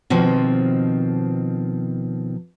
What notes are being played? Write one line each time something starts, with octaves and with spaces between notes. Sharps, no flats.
B2 D#3 F3 C4